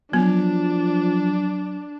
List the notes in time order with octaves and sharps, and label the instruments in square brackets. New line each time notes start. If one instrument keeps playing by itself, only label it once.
[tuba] F3 [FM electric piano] F#3 [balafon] B3 [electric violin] D4